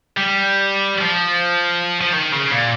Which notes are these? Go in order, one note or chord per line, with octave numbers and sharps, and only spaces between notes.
G3
F3
F3
D#3
C#3
A#2